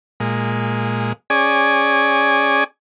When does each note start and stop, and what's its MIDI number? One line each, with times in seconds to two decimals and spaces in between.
0.20 1.13 46
0.20 1.13 56
1.30 2.64 61
1.30 2.64 68
1.30 2.64 74
1.30 2.64 80